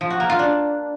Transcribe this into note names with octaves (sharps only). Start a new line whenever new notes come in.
F3
F#4
A#3
F4
D4